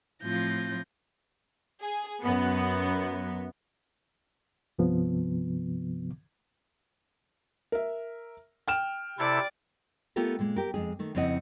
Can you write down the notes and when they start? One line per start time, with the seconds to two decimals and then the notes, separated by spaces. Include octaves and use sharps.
0.22 A2 F3 C4 F4 G6 A#6
1.81 G#4
2.23 F#2 B3
4.79 C2 G2 C3 F3 B3
7.72 A#4 E5
8.68 G5 F6 E7
9.19 C3 E4 A4 D5
10.16 A3 B3 F4 G4 A4 A#4
10.39 A#2 G#3
10.56 G4 A#4
10.74 F2 G#3 G#4
10.99 D#3 A3
11.15 F2 C#3 C4 E4 D#5 F#5